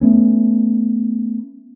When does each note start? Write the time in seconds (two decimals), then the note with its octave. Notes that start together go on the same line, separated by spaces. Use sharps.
0.01 A3 B3 C#4